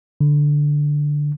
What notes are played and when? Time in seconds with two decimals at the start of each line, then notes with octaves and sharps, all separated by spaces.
0.21 D3